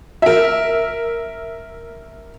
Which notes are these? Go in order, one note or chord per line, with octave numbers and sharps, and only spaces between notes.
A#4 E5